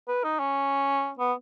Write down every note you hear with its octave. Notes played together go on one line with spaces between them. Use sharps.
B4
D#4
C#4
B3